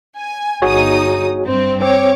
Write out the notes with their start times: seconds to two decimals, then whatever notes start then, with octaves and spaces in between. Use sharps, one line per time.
0.18 G#5
0.62 G1 D#4 F#4 G#4 C#5 D#6
1.47 G2 C4
1.82 C4 C#5 D6